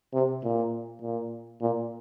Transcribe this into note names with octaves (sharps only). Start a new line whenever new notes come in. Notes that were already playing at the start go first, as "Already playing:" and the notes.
C3
A#2
A#2
A#2